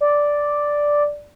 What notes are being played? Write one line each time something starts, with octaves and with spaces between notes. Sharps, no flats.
D5